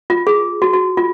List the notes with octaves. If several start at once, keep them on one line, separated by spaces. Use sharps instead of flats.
F4
G#4
F#4
F#4
F4